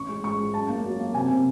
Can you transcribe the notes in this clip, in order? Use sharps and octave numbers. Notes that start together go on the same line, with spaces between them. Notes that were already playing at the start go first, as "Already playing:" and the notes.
Already playing: A1 C#6
G#3
G#2 C#6
G#3
F#2 A5
A#3
F#3
A#3
C3 G#5
C3